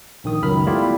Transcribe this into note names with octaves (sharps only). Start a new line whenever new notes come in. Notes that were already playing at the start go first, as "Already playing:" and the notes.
A#1 D#3 D#6
C#2 F#2 D#3 B5 F6
G3 A3 B3 E4 F4 G4